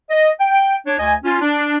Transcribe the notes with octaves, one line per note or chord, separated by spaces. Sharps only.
D#5
G5
D4 C#5
D2 D#5 G#5
C#4 F4
D4